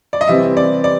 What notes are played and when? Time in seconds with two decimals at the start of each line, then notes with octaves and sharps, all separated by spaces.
0.13 D5
0.21 D#5
0.28 C3 E3 G3 C4 E5
0.57 D5
0.84 D5